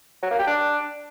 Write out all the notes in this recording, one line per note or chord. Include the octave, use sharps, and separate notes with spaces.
F#3
A#3
G4
D4